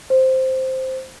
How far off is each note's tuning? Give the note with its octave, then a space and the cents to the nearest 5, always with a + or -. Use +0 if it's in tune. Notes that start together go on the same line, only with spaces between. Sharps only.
C5 +0